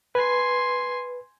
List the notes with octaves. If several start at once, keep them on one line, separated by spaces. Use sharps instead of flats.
B4 G#5 C6